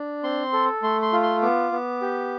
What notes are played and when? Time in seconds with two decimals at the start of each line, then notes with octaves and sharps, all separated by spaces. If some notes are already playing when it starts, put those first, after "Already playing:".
Already playing: D4
0.24 C4 C6
0.53 A4
0.82 A3 C6
1.02 C6
1.13 F4
1.23 C6
1.42 B3 D6
1.72 B3
2.02 G4